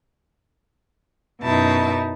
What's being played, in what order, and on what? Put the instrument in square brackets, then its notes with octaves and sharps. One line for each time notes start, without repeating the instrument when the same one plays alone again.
[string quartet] F#2 B2 D#4 E4 A5